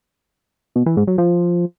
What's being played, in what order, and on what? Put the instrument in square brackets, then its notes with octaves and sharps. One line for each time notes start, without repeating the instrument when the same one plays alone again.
[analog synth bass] B2
E3
G#2
F#3
F3